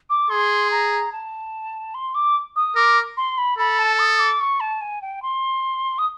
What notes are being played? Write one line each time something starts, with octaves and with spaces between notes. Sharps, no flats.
D6
G#4 C6
A#5
A5
C6
D6
D#6
A#4 D6
C6
B5
A4 B5
A5
D#6
D6
C#6
A5
G#5
G5
C6
D#6